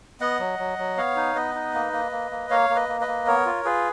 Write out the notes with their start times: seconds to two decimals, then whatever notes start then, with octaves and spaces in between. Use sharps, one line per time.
0.21 B3 D#5 F#5
0.40 F#3
0.59 F#3
0.78 F#3
0.97 B3 C#5 F5
1.16 D#4
1.35 B3 B4 D#5
1.55 D#4
1.74 A#3
1.93 A#3
2.12 A#3
2.31 A#3
2.50 A#3 C#5 F5
2.70 A#3
2.75 B4 D#5
2.89 A#3
3.01 B4 D#5
3.07 A#3
3.27 B3 A#4 C#5
3.46 F4
3.64 F4 G#4 B4